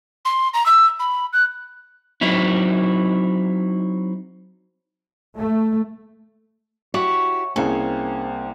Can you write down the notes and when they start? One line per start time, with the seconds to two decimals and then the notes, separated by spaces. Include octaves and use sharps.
0.25 C6
0.53 A#5
0.65 E6
0.99 B5
1.32 F#6
2.21 F#3 C4 D#4 E4
5.37 A3
6.94 E4 F#4 G4 C#5
7.56 C2 A#3 C4 C#4 G#4